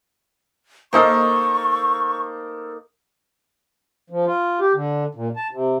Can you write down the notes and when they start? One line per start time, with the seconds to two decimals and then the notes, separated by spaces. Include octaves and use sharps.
0.93 A#3 D#4 A4 A#4 C5 C#6
4.10 F3
4.26 F4
4.60 G4
4.74 D3
5.15 A#2
5.36 A5
5.51 C3